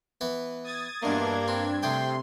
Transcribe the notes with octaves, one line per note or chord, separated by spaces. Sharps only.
E3 B3 B4
D#6 G#6 A6
E2 G2 B2 A#3 D4 G#6
C4
C3 A3 G#4 G5 C6 D6